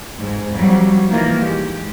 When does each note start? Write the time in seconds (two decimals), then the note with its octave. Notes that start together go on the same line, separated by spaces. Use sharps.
0.19 G#2
0.52 F2 F#3 G3
1.09 D#3 E3 A#3 D#4 F4
1.39 G#3 G4